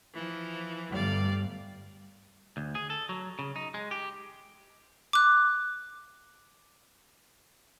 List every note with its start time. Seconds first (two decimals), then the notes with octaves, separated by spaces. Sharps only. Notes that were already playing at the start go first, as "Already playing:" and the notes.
0.13 E3 F3
0.91 G1 G2 G3 A3 D5 F5
2.57 D2
2.75 G#4
2.90 A4
3.09 F#3
3.39 C#3
3.56 D#4
3.74 G#3
3.91 G4
5.13 D6 F#6